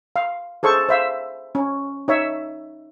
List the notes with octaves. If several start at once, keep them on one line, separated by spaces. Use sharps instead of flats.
F5
G#4 A4 C5 C#6
C5 E5 F5
C#4
D#4 C#5 E5